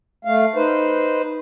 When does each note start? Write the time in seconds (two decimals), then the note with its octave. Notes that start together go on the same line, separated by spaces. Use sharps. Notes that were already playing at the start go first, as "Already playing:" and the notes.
0.25 A3 F5
0.56 D#4 B4 C5